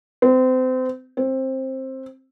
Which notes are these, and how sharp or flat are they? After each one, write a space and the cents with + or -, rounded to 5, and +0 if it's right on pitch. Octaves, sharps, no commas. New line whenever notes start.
C4 -30
C4 +15